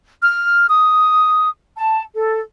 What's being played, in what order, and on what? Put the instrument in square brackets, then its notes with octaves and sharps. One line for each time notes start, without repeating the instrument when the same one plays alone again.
[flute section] F6
D#6
A5
A4